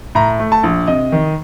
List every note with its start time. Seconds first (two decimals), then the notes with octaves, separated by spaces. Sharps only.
0.15 A2 A#5
0.39 A3
0.52 A5
0.63 A#1
0.88 C3 D#5
1.12 D#3